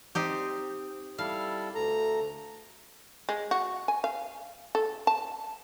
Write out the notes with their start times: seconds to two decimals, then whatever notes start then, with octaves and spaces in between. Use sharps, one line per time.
0.15 C4 D#4 G4
1.18 G3 E4 A4 F5
1.75 D2 A4 A#5
3.29 G#3
3.51 F#4
3.88 G#5
4.04 F5
4.75 A4
5.07 A5